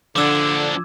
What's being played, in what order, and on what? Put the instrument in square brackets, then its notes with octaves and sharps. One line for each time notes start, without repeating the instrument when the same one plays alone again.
[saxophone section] D3 [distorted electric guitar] F3 D4 [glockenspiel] D6 E6 G#6